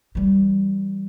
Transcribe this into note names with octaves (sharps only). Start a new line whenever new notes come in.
E3 G3